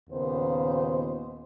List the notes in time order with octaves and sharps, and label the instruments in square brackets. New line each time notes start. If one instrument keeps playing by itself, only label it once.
[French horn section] D#2 A#2 C#3 B3 C5